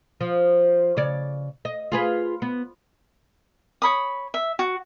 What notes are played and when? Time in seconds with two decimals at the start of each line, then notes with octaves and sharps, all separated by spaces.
0.21 F3
0.97 C#3 C#5 D5
1.65 D#5
1.92 F4 G#4 B4
2.42 B3
3.82 C#5 B5 D#6
4.34 E5
4.59 F#4